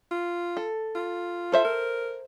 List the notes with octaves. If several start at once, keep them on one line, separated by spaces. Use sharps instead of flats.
F4
A4
F4
A4 C5 E5
A#4